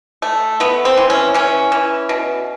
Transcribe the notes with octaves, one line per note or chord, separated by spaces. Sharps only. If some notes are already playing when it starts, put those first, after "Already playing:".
A3
A3 B3
C4
E3
C#4
E3 C#4
E3
B2